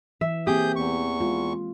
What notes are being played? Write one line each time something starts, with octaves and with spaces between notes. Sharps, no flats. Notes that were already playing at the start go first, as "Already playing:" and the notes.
E3 E5
A#3 C4 G4 G#4 D#6 G6
E2 C#6
G#3 F4